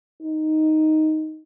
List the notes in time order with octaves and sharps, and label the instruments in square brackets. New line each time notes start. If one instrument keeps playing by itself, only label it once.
[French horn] D#4